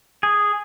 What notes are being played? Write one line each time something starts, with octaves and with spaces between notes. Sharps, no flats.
G#4